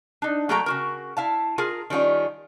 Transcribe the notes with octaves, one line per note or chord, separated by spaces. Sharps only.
D4 D#4
F#3 A3 A#3 A4 G5 A#5
C#3 F#4 A#4
E4 F5 A5
F4 G#4 A#4
D#3 G3 C#4 F4